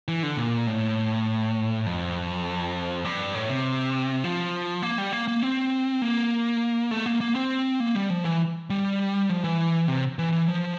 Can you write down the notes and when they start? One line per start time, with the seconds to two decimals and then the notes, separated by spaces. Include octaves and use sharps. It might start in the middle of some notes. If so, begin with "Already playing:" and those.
0.08 E3
0.23 D3
0.37 A#2
0.67 A2
1.86 F2
3.05 G2
3.34 A2
3.49 C3
4.24 F3
4.82 A#3
4.98 G3
5.12 A#3
5.28 A#3
5.42 C4
6.02 A#3
6.91 A3
7.06 A#3
7.21 A#3
7.36 C4
7.80 A#3
7.95 G3
8.10 F3
8.25 E3
8.70 G3
9.29 F3
9.44 E3
9.88 C3
10.19 E3
10.32 E3
10.48 F3